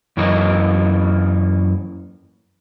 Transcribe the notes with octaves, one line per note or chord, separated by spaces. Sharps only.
F#2 E3 A#3 D#4